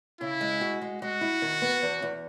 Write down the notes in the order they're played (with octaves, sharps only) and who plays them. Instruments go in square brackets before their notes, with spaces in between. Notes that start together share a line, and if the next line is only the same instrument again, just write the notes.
[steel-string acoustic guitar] C#3 [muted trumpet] E4
[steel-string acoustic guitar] G#3
F#4
G#3
[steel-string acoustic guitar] G#3 [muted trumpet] F#4
[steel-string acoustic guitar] E4
D#3
B3
E2
E2